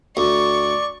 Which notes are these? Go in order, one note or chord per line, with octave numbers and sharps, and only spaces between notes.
D2 D5 C#6